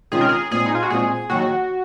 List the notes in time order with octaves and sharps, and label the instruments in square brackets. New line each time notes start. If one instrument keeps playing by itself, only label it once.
[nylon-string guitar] C3 D#3 G#3 C#4 F4 [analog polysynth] G#4
[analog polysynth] A#4
G#4
[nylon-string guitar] A#2 G#3 C4 F4 [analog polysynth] G#4
[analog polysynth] D#4
F4
F#4
[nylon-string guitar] A#2 G#3 C4 F4 [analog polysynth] G#4
[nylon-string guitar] D#2 D#3 F#3 [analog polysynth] F#4